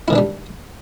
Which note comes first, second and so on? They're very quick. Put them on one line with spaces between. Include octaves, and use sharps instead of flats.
E4 D#3 E3 D4 G3